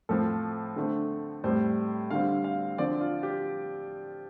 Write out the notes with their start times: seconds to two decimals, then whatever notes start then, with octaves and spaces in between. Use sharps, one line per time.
0.09 A2 F3 C4 A4
0.76 D3 A3 C4
1.44 A2 G3 C4 C5
2.10 D3 G3 C4 F5
2.44 F5
2.78 D3 F3 C4 D5
3.01 F4
3.23 G4